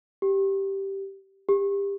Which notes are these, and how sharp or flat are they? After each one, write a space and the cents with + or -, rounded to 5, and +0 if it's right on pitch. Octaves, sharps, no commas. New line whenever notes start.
G4 -5
G4 +25